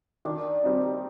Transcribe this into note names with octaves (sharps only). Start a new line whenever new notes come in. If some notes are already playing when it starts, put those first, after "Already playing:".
D#3 D4 D5
G3 C4 D#4